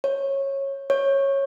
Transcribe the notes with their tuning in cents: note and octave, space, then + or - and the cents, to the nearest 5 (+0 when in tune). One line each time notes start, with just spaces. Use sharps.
C#5 -15
C#5 -10